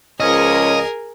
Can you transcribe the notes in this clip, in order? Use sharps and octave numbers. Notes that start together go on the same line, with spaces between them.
C#2 F3 C#4 G#4 A#4 D#5